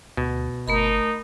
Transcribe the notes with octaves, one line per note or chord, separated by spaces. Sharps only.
D2 B2
G1 A3 D#4 A#4 B5